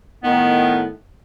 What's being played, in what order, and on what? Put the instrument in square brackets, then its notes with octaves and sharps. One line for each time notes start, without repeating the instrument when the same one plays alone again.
[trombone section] A2 D#3 [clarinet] B3